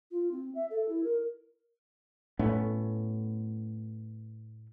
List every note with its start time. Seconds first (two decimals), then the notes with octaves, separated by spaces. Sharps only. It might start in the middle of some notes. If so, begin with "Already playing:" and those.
0.11 F4
0.32 C4
0.55 E5
0.71 A4
0.89 E4
1.04 A#4
2.39 A2 A3 B3 C#4